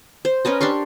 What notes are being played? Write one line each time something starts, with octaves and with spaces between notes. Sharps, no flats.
C5
C#4 A#4 B4 D#5
D4 G4 C6 C#6